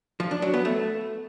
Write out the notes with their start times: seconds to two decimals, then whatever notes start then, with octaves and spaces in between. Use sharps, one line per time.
0.20 F3
0.31 D4
0.42 F#3
0.54 B3
0.65 A3